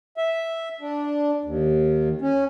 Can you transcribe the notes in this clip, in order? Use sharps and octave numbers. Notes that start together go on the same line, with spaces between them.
E5
D4
D#2
C#4